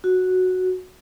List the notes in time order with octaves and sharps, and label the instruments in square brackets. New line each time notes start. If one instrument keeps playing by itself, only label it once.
[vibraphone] F#4